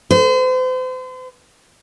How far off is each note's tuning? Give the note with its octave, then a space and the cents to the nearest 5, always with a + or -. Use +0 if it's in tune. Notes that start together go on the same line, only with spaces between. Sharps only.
C5 -40